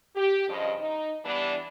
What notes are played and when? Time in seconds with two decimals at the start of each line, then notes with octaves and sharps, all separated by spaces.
0.15 G4
0.49 G2 C#3 F3 D#5
0.79 D#4
1.24 E3 G3 B3 D4